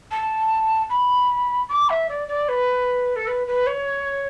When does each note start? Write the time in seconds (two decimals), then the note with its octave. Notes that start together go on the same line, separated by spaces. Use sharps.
0.11 A5
0.90 B5
1.69 D6
1.89 E5
2.09 D5
2.28 D5
2.48 B4
3.16 A4
3.27 B4
3.47 B4
3.66 C#5